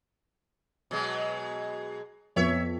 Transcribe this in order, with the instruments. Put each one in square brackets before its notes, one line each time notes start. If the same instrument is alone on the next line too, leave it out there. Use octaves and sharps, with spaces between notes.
[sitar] B2 F#3 G#3
[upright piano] F2 B3 [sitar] C#5 E5